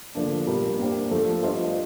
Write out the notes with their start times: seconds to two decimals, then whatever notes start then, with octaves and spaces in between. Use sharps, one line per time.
0.15 D3 F3 A#3 D4
0.46 A#2 G3 A#3
0.79 A#3 D4 G4 C5
1.11 F3 A3 D4 A4
1.43 G3 D4 F4 C5 D#5